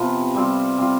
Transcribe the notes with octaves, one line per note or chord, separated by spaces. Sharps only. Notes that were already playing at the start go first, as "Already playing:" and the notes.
Already playing: C3 F3 B3 F4
G3 C4 F4
G3 C4 F4